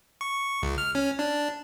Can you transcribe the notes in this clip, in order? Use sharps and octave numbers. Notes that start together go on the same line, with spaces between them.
C#6
C#2
F6
C#4
D4